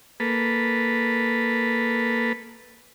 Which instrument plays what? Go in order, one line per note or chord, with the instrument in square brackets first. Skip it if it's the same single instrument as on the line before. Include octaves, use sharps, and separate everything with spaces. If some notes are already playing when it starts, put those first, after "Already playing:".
[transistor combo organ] A#3 A4 B4